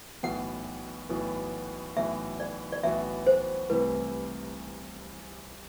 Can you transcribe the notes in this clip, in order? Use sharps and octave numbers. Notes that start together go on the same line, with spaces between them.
B1 A2 E3 B3 F#4 F#5
B1 A2 E3 B3 F#4
B1 A2 E3 B3 F#4 E5
D5
D5
B1 A2 E3 B3 F#4 E5
C5
C2 C3 E3 A3 E4 B4